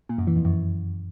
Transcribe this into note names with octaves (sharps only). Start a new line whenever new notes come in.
A#2
F#2
E3
F2
F#2